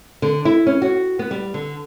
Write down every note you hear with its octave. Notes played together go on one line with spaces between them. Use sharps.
D3
E4
C#4
F#4
B3
G3
D3